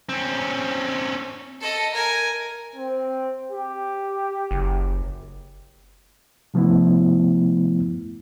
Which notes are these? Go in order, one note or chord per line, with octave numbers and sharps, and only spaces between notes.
C4 C#4
A4 D#5
A#4 G#5
C4
G4
F#1
C3 F3 A3 B3 E4